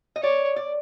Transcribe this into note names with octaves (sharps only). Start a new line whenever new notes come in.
D#5
C#5 D5
D5